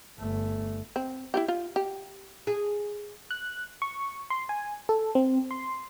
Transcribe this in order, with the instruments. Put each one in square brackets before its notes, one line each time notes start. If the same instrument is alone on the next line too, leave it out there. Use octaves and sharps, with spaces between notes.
[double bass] G1 A3
[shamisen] C4
E4 F4 G4
F4
G4
[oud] G#4
[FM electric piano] F#6
C#6
C6
G#5
A4
C4
C6